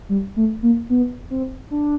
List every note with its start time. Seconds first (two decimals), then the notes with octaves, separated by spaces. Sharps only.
0.09 G3
0.36 A3
0.63 A#3
0.90 B3
1.30 C4
1.71 D4